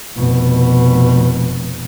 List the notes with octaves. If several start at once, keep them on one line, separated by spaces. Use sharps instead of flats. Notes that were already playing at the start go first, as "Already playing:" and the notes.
F1 B2